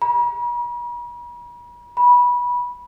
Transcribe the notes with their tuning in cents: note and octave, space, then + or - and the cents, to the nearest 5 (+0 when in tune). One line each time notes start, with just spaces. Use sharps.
B5 -45
B5 -20